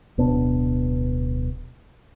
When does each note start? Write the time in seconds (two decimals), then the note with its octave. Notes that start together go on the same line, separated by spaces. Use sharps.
0.18 D1 B2 B3 D4